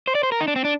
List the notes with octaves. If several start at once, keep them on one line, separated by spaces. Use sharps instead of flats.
C5
D5
C5
A#4
D#4
D4
C4
D4